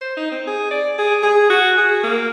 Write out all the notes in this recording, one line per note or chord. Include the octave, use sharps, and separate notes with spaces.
C5
D#4
C4
G#4
D5
G#4
G#4
F#4
G#4
A#3